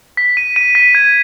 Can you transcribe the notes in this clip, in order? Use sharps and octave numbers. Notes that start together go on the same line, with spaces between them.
B6
D#7
D#7
B6
G#6